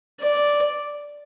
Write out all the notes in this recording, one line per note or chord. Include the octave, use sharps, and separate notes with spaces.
D5